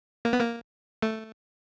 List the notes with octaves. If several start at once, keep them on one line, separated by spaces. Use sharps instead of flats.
A#3
B3
A#3
A3